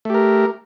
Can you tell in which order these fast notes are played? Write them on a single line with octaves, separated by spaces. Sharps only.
A3 G4 A#4